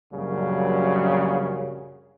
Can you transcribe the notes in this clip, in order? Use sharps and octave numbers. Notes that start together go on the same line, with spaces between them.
A#1 F#2 C#3 F#3 G3